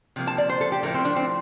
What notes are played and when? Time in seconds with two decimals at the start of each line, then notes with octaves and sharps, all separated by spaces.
0.16 C3 F3 A#3
0.27 A5
0.38 D5
0.49 C5
0.61 A4
0.72 G4
0.83 A2 F3 A3 A#4
0.94 C4
1.05 D4
1.16 C4